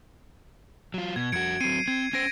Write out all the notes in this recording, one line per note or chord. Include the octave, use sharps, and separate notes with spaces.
F#3 F4
B2 G#6
F2 F#4 G#6 C#7 D7
F#3 C4 C7 C#7 D#7
C4 G#6
C#4 C5 G#6 A#6 D7